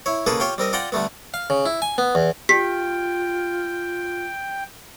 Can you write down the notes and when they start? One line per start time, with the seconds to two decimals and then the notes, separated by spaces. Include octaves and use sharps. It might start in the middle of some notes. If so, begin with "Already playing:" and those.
0.06 E4 C#5
0.26 C#3 A#3 G#4 A4 B4
0.40 F4 G4 C#5 F5 G5
0.58 G3 C4 A#4 D#5
0.73 F4 D5 F#5 G5 A#5 C6
0.92 D3 G3 A3 B3
1.34 F5
1.50 C#3
1.66 E4
1.82 G#5
1.98 B3
2.15 E2
2.49 F4 G4 G5 B6